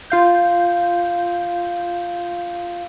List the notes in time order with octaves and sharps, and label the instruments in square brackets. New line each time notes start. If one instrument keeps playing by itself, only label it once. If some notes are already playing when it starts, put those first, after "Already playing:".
[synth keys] F4 F5 G6